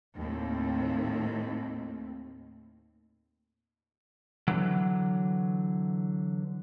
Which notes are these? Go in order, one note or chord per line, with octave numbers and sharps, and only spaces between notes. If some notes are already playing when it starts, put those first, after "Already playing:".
D#2 A2 C4
D3 E3 F#3